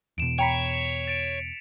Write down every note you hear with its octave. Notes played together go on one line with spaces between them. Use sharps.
E2 B2 D7 E7
C#5 G5 A#5 B5 B6 C#7 F7
A6 D7